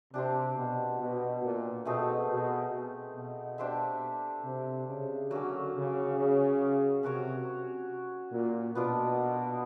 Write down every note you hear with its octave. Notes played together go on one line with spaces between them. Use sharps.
C3 D4 G4 C5
B2
B2
A#2
B2 A3 C4 D#4 G#4
B2
B2
D4 G4 C5 E5
C3
C#3
D3 F#3 A#3 C#4
C#3
C#3
C3 C#4 F#4 A#4 C#5
A#2
B2 B3 D4 F4 A#4